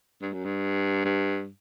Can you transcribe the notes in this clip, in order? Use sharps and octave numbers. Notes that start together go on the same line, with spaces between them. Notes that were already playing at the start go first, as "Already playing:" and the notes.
G2
F#2
G2
G2